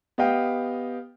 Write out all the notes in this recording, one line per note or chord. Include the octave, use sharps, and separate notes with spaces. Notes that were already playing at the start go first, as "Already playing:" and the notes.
B3 G4 D#5 F5 G5